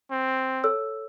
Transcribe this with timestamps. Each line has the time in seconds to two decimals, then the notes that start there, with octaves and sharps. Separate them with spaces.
0.11 C4
0.64 A4 C#5 E6